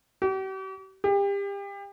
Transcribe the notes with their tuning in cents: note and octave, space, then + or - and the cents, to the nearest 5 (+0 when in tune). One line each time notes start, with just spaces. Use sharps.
G4 -45
G4 +30